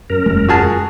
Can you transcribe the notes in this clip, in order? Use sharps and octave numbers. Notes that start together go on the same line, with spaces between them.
F#2 A#4
E1 G#3
F#4 G#4 A5